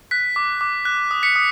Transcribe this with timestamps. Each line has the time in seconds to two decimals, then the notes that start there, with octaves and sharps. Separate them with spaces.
0.11 F#6 B6
0.36 D6
0.61 D6
0.85 F#6
1.11 D#6
1.23 B6 C#7
1.36 D#6